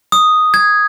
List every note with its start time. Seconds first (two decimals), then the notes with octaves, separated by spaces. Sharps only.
0.12 D#6
0.54 G#6